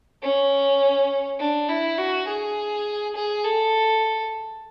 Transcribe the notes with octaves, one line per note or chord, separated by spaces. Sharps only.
C#4
D4
E4
F#4
G#4
G#4
A4